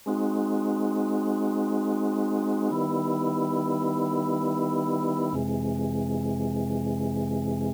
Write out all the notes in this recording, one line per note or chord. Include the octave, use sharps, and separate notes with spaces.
G#3 C4 D#4 F#4
D#3 G3 B3 E4
F2 C3 E3 G#3